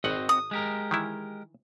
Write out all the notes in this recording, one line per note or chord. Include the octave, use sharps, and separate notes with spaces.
G#1 C4 F#4 D#5 F#5
D#6
G#3 G4 A#4
D#3 E3 E4